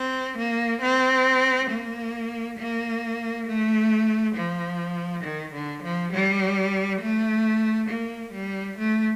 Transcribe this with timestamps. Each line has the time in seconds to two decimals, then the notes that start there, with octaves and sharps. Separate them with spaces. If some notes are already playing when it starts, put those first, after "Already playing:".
Already playing: C4
0.38 A#3
0.82 C4
1.70 A#3
2.59 A#3
3.47 A3
4.36 F3
5.24 D#3
5.54 D3
5.83 F3
6.13 G3
7.01 A3
7.89 A#3
8.34 G3
8.78 A3